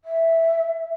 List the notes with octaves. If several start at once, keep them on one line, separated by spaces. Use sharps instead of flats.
E5